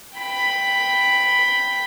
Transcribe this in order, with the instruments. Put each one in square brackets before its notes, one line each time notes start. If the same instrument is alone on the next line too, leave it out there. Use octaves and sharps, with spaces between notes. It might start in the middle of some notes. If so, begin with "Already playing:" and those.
[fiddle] G5 B5